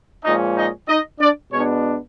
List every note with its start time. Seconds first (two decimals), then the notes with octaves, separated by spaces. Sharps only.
0.24 A#2 F3 G#3 C#4 D#4 D#5
0.56 D#4 D#5
0.88 D#4 D#5
1.20 D4 D5
1.52 B2 G#3 B3 C#4 D4 C#5